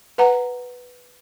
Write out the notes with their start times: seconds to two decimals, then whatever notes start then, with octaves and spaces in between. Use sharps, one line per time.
0.18 B4 F#5 A#5